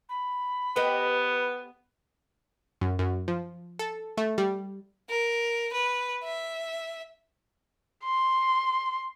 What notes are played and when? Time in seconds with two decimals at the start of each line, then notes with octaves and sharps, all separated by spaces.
0.09 B5
0.76 B3 G4 B4 D#5
2.81 F#2
2.99 F#2
3.28 F3
3.79 A4
4.18 A3
4.38 G3
5.10 A#4
5.73 B4
6.23 E5
8.05 C6